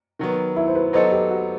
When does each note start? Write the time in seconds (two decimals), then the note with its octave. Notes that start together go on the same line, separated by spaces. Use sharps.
0.19 D#3 F#3 B3
0.56 E4
0.68 C5
0.75 B4
0.93 F#3 B3 D#4 A4 C5 D#5
1.12 G4
1.31 F#4